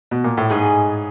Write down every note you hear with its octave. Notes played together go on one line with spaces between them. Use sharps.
B2
A#2
A2
G#2 G#4 B4 D#5 G#5